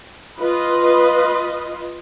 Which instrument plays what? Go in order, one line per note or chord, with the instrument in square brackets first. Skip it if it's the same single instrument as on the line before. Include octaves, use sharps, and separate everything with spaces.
[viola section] F4 B4 D#5